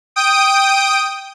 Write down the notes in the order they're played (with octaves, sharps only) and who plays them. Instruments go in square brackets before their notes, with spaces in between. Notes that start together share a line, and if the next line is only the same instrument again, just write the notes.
[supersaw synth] G5 D#6 D7